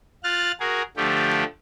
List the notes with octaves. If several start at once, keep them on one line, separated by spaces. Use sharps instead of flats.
F4 F6 F#6 A6
F#4 G#4 A#4
D3 F3 A3 G4